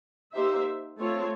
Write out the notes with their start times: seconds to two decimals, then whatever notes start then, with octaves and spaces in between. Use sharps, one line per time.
0.33 A#3 D#4 G4 C5 E5
0.99 A3 C4 F4 A4 C#5